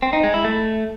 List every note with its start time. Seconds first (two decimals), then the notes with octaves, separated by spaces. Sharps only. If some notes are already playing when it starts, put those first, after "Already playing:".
0.02 C4
0.13 D#4
0.23 G#3
0.34 E4
0.44 A3